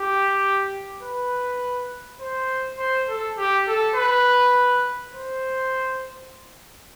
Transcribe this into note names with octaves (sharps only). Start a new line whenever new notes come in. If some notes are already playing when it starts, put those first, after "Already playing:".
Already playing: G4
B4
C5
C5
A4
G4
A4
B4
C5